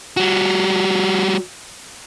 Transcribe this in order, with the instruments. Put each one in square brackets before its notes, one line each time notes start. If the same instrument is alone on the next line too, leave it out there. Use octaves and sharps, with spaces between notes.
[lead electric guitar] G3 F#4